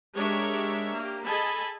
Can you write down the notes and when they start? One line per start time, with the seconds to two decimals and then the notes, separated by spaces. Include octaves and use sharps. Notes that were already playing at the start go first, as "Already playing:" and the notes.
0.14 G#3 D4 G4 A#4 C#5 E5
0.94 A#3 G4
1.25 G#4 A4 D#5 G#5 A5 B5